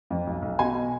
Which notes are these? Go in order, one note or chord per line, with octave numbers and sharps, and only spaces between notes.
F2
B1
B1
B2 G#5